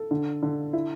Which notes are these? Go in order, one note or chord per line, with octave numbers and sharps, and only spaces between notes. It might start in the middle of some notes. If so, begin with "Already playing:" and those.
Already playing: A4
D3
D3
E4